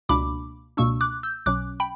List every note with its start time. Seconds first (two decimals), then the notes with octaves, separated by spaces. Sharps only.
0.09 C#2 B2 A#3 D4 B5 D6
0.77 C#2 B2 A#3 D4 C#6 E6
1.01 D6 F#6
1.23 E6 G6
1.46 B1 B2 F#3 C#4 D6 F#6
1.80 G5 B5